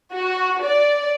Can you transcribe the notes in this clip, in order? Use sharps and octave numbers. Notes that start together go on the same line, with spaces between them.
F#4
D5